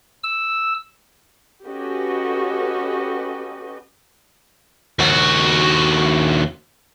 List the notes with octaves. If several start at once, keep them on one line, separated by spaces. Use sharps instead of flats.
E6
C#4 F#4 G4 A4 B4 D#5
D#2 F#4